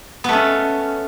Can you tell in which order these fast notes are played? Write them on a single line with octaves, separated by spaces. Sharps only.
B3 A3 C#4